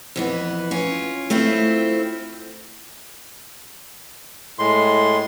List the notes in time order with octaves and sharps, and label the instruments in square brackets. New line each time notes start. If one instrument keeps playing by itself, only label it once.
[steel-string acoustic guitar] F2 E3 B3
C#4 F4
A3 C4 E4 F4
[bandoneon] A2 G#3 C6